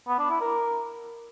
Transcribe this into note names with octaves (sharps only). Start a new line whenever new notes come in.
B3
D4
E4
A#4